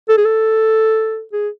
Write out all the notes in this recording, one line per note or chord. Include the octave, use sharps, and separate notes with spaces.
A4
G#4
A4
G#4